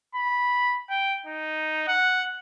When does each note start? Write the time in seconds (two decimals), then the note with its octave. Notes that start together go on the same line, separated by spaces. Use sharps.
0.15 B5
0.90 G5
1.26 D#4
1.88 F#5